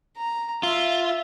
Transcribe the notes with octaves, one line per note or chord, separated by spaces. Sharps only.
A#5
F4 E5